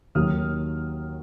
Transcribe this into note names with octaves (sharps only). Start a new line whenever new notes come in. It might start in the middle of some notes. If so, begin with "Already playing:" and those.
D#2 D#3 F#3 D#6 F6